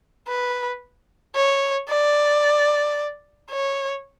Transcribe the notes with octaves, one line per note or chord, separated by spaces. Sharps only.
B4
C#5
D5
C#5